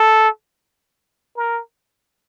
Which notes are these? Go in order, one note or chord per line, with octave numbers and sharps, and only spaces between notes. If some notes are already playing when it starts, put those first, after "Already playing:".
Already playing: A4
A#4